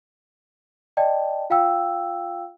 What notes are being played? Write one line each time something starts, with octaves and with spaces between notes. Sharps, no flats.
D5 D#5 G5 A5
F4 F5 G5 E6